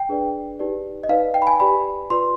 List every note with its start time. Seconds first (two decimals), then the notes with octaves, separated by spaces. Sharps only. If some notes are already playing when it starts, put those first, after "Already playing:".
Already playing: G5
0.09 D4 G#4 B4 D5
0.59 D#4 G4 B4 D5
1.03 D#5
1.09 D#4 B4 D5 F5
1.34 G5
1.42 B5
1.47 G#5
1.60 G4 B4 D5 B5
2.10 F4 B4 D5 C6